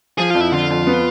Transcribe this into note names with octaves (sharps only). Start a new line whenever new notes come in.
F3 G#4
F2 F4
E4
D3 F4
F2
B3